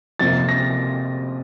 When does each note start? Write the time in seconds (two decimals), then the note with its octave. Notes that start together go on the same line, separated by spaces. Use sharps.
0.19 F2 C3 F3 A#3 A6
0.49 A#6